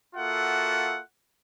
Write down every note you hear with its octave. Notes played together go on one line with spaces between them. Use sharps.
A#3 F4 F#4 A4 E5 F#5